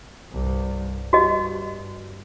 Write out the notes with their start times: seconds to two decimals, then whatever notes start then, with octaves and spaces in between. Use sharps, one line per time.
0.32 C2 G2
1.13 G2 F#4 G4 D#5